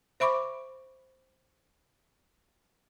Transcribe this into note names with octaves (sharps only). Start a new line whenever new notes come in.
C5 E5 B5 C#6 D6